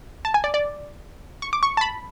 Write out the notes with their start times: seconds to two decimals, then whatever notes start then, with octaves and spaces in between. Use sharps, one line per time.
0.25 A5
0.34 G#5
0.44 D5
0.54 D5
1.42 C#6
1.53 D6
1.63 C#6
1.77 A5
1.81 B5